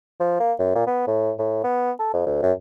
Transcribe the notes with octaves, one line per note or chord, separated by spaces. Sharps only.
F3
A#3
F#2
A#2
B3
A2
A2
B3
A4
F2
D2
F#2